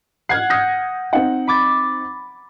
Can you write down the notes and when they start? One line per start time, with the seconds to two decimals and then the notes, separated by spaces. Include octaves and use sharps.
0.29 F#5 F6 G#6 C7
0.50 D#6 G6 A#6 C#7
1.13 C4 D#4 F#5
1.47 B5 D6 A6